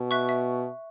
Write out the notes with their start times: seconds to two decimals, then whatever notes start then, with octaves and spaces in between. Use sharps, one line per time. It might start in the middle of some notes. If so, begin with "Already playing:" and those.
Already playing: B2
0.11 E5 C#6 F#6
0.29 E5